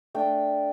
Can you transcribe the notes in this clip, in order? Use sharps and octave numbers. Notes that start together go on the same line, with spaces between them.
A3 D4 G5